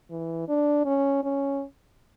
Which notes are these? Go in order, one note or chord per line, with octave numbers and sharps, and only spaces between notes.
E3
D4
C#4
C#4